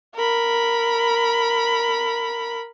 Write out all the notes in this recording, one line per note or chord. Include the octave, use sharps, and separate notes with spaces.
A#4 B5